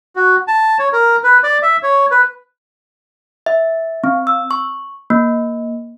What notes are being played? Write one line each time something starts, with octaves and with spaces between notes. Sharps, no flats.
F#4
A5
C#5
A#4
B4
D5
E5
C#5
B4
E5
C4
E6
C#6
A#3